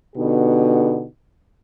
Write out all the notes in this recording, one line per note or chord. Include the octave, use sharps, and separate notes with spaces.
B2 D3 B3 D#4 G4